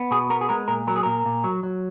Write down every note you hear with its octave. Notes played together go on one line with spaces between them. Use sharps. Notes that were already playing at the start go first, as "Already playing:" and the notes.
Already playing: B3
B2 G#4
B3 A#4
G#4
G#3 A#4
A#2 A#4
F#3 A#4
G#4
A#2 A#4
A#2
F#3
F#3